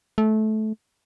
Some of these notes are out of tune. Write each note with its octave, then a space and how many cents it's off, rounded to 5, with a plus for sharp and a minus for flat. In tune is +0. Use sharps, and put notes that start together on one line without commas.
A3 -20